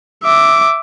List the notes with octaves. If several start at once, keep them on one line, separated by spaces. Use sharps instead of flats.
E5 D6